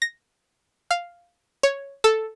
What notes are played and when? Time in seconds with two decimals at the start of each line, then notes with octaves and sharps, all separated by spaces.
0.02 A#6
0.91 F5
1.63 C#5
2.04 A4